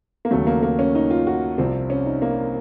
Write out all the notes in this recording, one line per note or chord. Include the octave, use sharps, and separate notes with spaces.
A#3
D#2 C#3 F#3 A3
A#3
A#3
C#4
D#4
F4
F#4
C2 C3 F3 C4
C#4
D#4
A#3